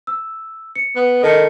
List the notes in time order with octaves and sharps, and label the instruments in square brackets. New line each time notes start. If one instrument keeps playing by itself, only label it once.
[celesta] E6
C#7
[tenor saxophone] B3
[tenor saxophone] D#3 [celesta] A4 A5 C#7